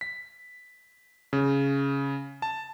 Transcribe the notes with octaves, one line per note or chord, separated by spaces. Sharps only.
B6
C#3
A5